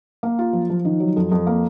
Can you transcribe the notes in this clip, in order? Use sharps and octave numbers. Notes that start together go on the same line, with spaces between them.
A#3
F4
F3
F3
D#3
F#3
F2
F2
A#3